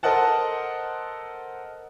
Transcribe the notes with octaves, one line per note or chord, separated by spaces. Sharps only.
A4 A#4 C5 D#5 F#5 A5